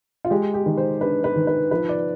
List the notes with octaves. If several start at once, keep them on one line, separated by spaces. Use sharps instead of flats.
F4
G#3 G4
G4
D#3
C5
D4 B4
B4
D#3
B4
F3 B4
D5